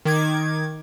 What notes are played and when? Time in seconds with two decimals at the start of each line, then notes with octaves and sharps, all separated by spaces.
0.05 D#3 D6 G#6